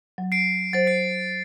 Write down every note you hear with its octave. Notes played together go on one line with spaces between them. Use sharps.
F#3
C7 D7
F#3 C5 A6
C7